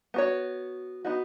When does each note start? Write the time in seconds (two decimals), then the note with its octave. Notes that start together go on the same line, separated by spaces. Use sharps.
0.14 B3 F#4 C#5
1.05 B3 D#4 F#4